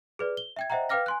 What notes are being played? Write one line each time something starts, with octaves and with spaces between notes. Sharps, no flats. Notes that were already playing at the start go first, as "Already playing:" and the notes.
G#4 B4 D5
G7
E5 G5 G#6
C5 D#5 E5 F#5 G5 A#5
B4 F5 G5 D6 F6 A#6
G#5 C6 F#6